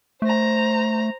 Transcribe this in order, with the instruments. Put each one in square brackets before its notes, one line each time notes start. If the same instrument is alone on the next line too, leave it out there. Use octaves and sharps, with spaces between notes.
[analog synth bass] A3 [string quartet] C5 A#5